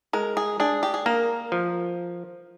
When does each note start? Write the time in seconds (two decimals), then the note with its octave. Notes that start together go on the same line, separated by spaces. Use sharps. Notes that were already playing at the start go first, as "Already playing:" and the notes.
0.13 G#3 A#4
0.37 G#4
0.60 D4 G#4
0.83 G4
0.94 G#4
1.06 A#3 A#4
1.52 F3